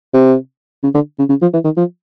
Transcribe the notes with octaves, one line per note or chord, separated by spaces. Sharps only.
C3
C#3
D3
C#3
C#3
F3
E3
D#3
F3